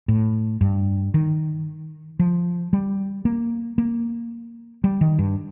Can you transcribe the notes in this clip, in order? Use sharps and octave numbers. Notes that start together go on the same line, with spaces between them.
A2
G2
D#3
F3
G3
A#3
A#3
G3
D#3
G2